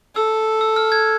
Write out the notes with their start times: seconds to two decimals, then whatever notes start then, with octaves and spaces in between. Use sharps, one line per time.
0.16 A4 E6
0.61 E6
0.76 F6
0.92 G#6